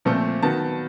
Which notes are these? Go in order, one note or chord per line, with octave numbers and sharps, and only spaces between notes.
A#2 F3 A3 C4
D#3 F#3 B3 A5